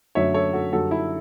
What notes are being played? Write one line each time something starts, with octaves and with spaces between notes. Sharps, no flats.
F#2 D3 F#3 A3 C#5 E5
A4 C#5
F#4 A4
F#2 D3 G3 F#4 A4
E4